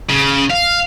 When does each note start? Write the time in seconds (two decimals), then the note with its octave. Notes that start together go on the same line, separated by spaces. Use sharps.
0.09 C#3
0.50 F5